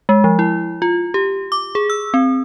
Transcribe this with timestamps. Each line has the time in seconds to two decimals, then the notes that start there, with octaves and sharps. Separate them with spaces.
0.09 G#3
0.24 F3
0.39 E4
0.82 F4
1.14 G4
1.52 D6
1.75 G#4
1.90 E6
2.14 C4